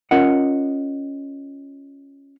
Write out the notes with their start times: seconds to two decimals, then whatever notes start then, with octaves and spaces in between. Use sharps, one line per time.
0.11 C#4 F4 A#4 D#5 F#5